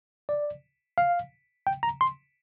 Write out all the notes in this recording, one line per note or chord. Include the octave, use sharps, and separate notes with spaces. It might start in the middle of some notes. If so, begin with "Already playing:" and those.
D5
F5
G5
A#5
C6